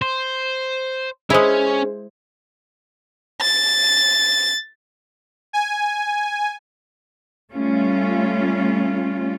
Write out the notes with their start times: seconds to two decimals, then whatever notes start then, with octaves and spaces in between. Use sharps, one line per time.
0.02 C5
1.30 G#3 C#4 E4 G#4 C5
3.42 A6
5.53 G#5
7.52 G3 A3 C#4 F4